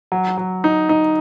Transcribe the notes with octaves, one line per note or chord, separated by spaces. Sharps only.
F#3
F#3
D#4
D#4